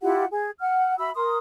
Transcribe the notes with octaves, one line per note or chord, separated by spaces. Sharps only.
E4 F4 G4 F#5
G#4
F#5 F6
F#4 E5 B5 E6
A#4 C6 D#6